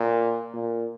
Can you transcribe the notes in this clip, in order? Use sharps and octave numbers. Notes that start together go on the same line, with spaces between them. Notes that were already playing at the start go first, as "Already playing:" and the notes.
Already playing: A#2
A#2